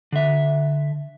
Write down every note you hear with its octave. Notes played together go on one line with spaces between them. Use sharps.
D3 E5